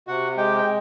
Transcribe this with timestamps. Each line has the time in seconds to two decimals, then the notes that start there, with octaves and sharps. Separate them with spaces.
0.07 C3 F#4 F#5
0.37 G#3 G4 G5
0.58 G5